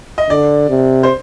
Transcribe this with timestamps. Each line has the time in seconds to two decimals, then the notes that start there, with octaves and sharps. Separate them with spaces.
0.18 D#5
0.30 D3 D5
0.69 C3
1.03 C5